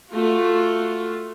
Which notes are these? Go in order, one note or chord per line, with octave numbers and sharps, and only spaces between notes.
A3 F4 F#4